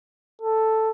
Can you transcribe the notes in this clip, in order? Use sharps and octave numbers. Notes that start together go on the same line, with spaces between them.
A4